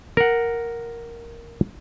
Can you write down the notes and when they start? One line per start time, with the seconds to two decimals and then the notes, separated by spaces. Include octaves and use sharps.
0.17 A#4 F#5